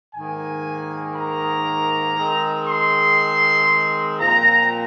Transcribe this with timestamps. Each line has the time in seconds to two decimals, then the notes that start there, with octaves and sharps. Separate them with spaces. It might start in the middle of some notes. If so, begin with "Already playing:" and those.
0.14 G#2 D#3 A#3 G#5
1.15 A#5
2.17 D#3 G#3 C4
2.68 C6
4.19 A#2 F3 C4 A#5